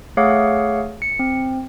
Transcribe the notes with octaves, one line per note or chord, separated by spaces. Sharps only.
A3 G#4 C#5 F5 F#5 D6
C#7
C4